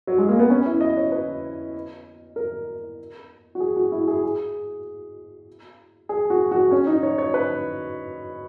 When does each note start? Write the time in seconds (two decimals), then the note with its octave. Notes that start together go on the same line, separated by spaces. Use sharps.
0.07 F#3
0.18 G#3
0.29 A#3
0.39 B3
0.50 C#4
0.66 E4
0.81 D#5
0.97 C#5
1.12 B4
2.36 A#4
3.55 F#4
3.60 G#4
3.77 F#4
3.92 E4
4.08 G#4
4.23 G#4
6.09 G#4
6.30 F#4
6.52 F#4
6.71 C#4
6.87 D#4
7.03 C#5
7.18 C#5
7.34 B4